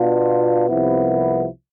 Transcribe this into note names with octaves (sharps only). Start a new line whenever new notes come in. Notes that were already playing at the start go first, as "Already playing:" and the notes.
Already playing: B2 B3 D4 F4
C2 C3 F3 B3 E4